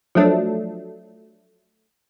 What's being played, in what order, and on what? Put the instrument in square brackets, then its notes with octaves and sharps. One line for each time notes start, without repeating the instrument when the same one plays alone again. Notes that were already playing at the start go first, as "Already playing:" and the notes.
[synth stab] F3 F#3 A3 D4